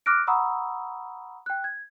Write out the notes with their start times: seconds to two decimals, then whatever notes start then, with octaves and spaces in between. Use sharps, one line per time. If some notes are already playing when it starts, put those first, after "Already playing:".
0.06 D6 F6 F#6 A#6 D7
0.27 F#5 A#5 B5 C#6 D#6 E6
1.46 G5 F#6
1.64 G#6